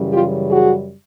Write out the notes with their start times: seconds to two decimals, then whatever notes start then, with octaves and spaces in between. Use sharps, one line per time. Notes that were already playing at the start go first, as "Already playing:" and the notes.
Already playing: F#2 C#3 E3 G3
0.13 F4 G4
0.50 F#4 G#4